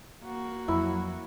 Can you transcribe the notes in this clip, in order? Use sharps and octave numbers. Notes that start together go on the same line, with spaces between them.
A#3 F#4
F2 F#3 E4